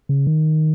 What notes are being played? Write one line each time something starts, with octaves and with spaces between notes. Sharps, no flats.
C#3
D#3